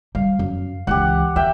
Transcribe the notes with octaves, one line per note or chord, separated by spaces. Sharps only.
G3 F5
F#2
C#2 E3 G4 F#5
D#3 E5 G5